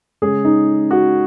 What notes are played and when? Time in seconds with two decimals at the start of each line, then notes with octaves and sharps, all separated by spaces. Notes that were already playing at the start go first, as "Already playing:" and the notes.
0.22 C#3 G#3 C#4 G#4
0.45 D#4
0.91 F#4